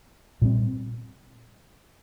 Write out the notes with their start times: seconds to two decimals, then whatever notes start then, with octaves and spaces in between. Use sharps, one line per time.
0.42 A#2 G3 C4